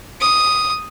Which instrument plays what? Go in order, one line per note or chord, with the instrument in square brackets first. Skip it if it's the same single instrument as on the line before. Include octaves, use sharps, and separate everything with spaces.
[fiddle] D#6